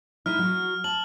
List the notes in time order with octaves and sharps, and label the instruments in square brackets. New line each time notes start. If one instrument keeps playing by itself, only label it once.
[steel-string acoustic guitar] G#3 D#4 E4 [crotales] F6
[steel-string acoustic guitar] F#3 F#4
[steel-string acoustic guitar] A5 [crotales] F#7